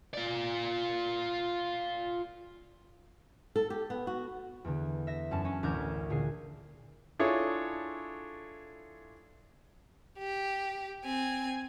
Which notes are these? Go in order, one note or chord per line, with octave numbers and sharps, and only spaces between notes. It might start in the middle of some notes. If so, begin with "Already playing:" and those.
F4 D5
A4
G4
B3
F#4
E2 D3
E5 A#6
F#2 C#4 A5
C#4
A1 D2 A#4 D6 G6 G#6
A#2 D3 G#4 C7
D4 E4 F4 G#4 A4 C#5
G4
C4 G#5